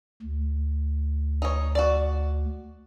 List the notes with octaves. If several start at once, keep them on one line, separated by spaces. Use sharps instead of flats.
D2
D#4 C#5
F#4 D5